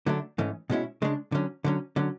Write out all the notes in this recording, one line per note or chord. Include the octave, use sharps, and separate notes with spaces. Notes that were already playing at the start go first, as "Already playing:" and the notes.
D3 F#3 A3 D4
G#2 E3 A3 C#4
B2 G#3 C#4 E4
C#3 G#3 D4
D3 F#3 C#4
D3 F#3 C#4
D3 F#3 C#4